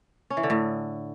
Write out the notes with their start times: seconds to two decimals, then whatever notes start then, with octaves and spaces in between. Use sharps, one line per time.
0.30 C#4
0.37 E3
0.43 D3
0.50 A2